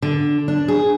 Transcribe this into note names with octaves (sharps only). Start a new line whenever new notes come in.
D3
D4
G#4